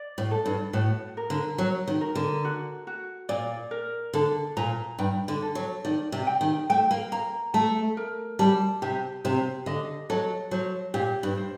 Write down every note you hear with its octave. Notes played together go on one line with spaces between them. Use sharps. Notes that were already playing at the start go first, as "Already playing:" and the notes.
Already playing: D5
A2
A4
G2
A2 F#4
A#4
D3
F#3 F#4
D#3
A#4
D3
F#4
F#4
A#2 D5
A#4
D3 A4
A#2 A#5
G2 G5
D3
A4
F#3
D#3 D5
C3
G5
D#3
A3 G5
A#3
A#3 A#5
A3 A5
A#4
G3 A5
C3 G4
C3 C5
D3 D#5
F#3 A4
F#3 C5
A#2 G4
G2
C5